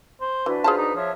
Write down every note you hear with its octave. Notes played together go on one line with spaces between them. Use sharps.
C5
E3 D4 F#4 B4
F4 G#4 C5 A5
D#4
F3 C#5 E5